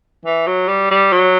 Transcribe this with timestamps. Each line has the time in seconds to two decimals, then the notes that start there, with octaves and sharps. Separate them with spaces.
0.25 E3
0.47 F#3
0.68 G3
0.91 G3
1.12 F#3